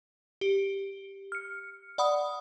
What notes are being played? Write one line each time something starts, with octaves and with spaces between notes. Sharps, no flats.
G4
F6 C#7
D5 F#5 B5 D#6